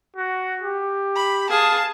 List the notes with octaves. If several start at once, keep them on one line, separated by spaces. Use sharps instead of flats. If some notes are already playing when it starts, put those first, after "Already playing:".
F#4
G4
B5
G#4 F5 A5